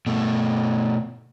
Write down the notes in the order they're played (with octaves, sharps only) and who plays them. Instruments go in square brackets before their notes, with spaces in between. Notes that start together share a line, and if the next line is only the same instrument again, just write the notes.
[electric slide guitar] B2 A3